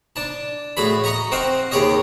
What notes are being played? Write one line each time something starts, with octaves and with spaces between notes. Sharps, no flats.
D4 A5
A2 F#4 G#4 B5
D#5 A#5 C#6 D#6
C4 F#4 D#5 F5
D#2 G4 G#4 C#5 D#5